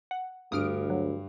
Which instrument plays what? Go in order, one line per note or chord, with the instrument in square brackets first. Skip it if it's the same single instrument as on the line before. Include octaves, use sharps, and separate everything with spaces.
[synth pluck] F#5
[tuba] D2 [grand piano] G2 [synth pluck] D#6 F6 D7
[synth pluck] F#3